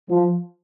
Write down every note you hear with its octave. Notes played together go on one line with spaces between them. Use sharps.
F3